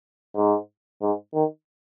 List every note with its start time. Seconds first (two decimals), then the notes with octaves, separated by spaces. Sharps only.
0.35 G#2
1.02 G#2
1.34 D#3